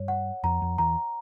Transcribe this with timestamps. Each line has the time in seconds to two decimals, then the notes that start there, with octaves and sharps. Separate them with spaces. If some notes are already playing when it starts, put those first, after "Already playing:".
Already playing: G2 C#5
0.08 F#5
0.44 F2 A#5
0.62 F2
0.78 E2 A#5